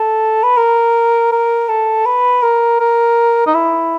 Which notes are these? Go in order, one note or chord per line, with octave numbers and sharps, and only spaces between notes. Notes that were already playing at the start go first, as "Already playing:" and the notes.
Already playing: A4
B4
A#4
A#4
A4
B4
A#4
A#4
D#4
E4